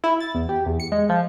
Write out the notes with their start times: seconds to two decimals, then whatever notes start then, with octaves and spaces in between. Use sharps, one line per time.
0.04 E4
0.20 A6
0.35 E2
0.49 G4
0.66 E2
0.80 C#7
0.92 G#3
1.09 F3